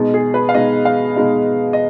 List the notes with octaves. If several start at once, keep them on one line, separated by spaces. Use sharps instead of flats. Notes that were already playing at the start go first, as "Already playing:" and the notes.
Already playing: B2 G#3 D#4
G#4
B4
F5
B2 G#3 D#4 D#5
F5
B2 G#3 D#4
D#5